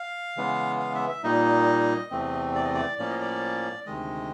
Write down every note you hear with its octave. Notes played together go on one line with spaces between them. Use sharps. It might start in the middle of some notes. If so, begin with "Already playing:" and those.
Already playing: F5
C#3 E3 G#3 B3
F5
E5
E5
A#2 G3 A#3 D#4 D#5
E2 C3 E3 A3 C4
D5
D#5
D5
A2 F3 A#3 C#4 D5
D#5
D5
D2 C3 D#3 G#3 D#5